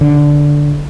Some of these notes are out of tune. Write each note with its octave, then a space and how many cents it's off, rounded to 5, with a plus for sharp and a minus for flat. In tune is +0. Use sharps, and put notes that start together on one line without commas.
D3 -5